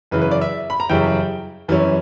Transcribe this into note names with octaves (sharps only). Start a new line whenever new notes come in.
F#2 C#3 E3 B4
B4
D5
E5
B5
A#5
F#2 C#3 E3 G3 G5
F#2 E3 G3 C#4